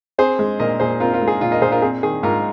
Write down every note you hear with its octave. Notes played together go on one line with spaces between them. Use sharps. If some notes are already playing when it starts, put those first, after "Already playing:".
C4 G#4 C5
G#3
A#2 A#4 D#5
A#2 G#4 C5
C4 F4 A#4
F4 A#4
G#3
G#4
A#2 F4
A#4 D#5
A#2 G#4 C5
F4 A#4
C4 G#4
D#3 G#4
G#2 F4 A#4